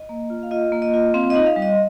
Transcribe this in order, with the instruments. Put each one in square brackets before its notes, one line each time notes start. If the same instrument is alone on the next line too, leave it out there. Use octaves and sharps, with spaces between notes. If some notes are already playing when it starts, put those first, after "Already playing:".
Already playing: [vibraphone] D#5
A#3
F4
F5
F4 D#5
A#3
D#5
F4
C4 F5
D#5
D#4
F5
G3
D#5